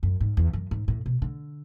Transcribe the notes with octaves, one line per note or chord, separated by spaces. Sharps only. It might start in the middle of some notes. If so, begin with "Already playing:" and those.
F#2
G#2
E2
F#2
G#2
A2
B2
D3